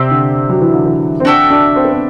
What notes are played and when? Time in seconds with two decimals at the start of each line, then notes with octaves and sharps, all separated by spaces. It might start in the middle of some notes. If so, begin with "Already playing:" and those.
Already playing: C3 C4 G4 D5
0.11 D3
0.49 F#3
0.61 E3
0.74 D3
0.86 E3
1.20 C4
1.25 D4 F#4 A4 E5 G5
1.50 D4
1.76 C4
1.84 B3
1.92 C4